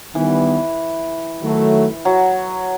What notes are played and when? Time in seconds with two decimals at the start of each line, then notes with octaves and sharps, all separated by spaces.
0.14 D#3 E3 G3 B3
1.41 D#3 F#3 A3
2.05 F#3